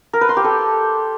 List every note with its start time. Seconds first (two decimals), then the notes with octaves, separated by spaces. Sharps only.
0.13 A#4
0.21 B4
0.29 C6
0.37 G4
0.44 A4